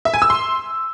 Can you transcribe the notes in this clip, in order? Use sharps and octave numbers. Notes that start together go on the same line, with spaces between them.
E5
G#5
E6
C6